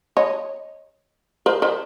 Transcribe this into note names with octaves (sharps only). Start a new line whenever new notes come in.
C#5 D#5
A#4 C5
A#4 C5